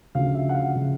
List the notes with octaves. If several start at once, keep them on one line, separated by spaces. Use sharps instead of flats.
D2 C#3 F3 F5
E5
F#5
F5
C#3 F3